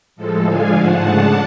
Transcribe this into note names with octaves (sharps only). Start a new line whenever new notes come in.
A2 F3 G#3 A4
D3 F3 G#3 D4 F5 G#5
G#2 F3 A3 F#5 A5
C#3 G#3 D4